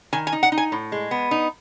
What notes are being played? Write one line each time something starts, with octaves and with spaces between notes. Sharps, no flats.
D#3 G#5
G#5
D#4
F#5
D#4
G#5
A2
G#3
B3
D#4